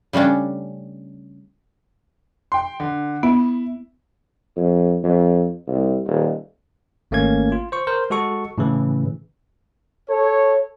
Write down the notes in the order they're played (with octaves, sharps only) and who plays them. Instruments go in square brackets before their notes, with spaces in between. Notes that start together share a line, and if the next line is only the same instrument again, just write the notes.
[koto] C#3 G3 A3 C#4 D4
[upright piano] G5 C6
D3
[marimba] B3 [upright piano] E4
[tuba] F2
F2
C2
D#1
[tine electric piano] G#1 A3 A#3 C#4 G#6
F4
C5 C#6
A#4 C5
G#3 F#4 A4 C#6
A2 C#3 E3
[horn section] A4 C#5